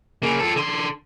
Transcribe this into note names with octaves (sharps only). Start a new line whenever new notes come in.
C#3 A#3
F4 A4
D3 C6